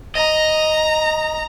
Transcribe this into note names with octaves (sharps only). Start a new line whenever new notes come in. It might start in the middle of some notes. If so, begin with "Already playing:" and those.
D#5 A#5